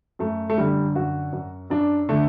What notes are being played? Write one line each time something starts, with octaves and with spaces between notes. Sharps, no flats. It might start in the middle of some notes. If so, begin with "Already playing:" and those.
F#2 A3
A3
D3 G3
F#2 F#4
F#2
F#2 D4
D3 A3